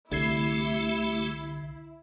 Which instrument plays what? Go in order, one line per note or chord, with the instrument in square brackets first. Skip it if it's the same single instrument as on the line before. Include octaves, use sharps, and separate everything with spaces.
[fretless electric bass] C2 [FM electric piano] D3 G#6 C7 [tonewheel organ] A3 G4 [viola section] E4